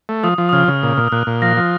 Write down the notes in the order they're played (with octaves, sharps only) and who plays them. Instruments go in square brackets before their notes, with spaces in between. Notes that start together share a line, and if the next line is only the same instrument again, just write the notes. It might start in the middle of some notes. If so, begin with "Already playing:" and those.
[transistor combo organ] A3
[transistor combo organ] F3 [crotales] D#6
[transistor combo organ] F3
[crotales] D#6
[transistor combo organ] C#3 [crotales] F6
[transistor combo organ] C#3
A#2
A#2
[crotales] F6
[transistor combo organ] A#2 [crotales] F#6
[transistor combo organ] A#2
[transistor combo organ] F3 [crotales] A#6
[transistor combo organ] F3